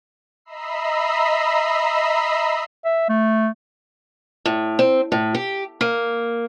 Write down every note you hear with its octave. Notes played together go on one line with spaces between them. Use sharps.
D#5 E5 A#5 B5 E6 C7
E5
A3
A2
C4
A2
G4
A#3